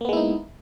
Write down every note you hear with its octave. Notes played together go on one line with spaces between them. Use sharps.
G#3 A#3 B3 D#4 E4